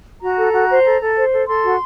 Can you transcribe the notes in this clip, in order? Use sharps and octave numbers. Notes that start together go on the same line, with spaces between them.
F#4 A#5
A4
F#4
C5
A4
A4
C5
A4
A4 C6
F#4